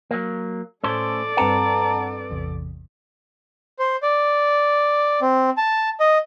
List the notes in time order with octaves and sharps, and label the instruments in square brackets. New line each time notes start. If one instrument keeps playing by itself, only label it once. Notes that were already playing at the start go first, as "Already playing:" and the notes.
[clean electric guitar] F#3 A#3
[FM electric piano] A2 A5 E6 [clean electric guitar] A3 C#4 C5 [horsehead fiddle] A4 D5
[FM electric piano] G2 C4 B4 [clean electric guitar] F#5 A5 A#5
[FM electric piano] A1 E2 C3
[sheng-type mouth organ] C5
D5
C4
A5
D#5